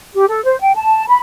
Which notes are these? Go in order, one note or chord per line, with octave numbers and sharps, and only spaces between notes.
G4
A4
C5
G5
A5
B5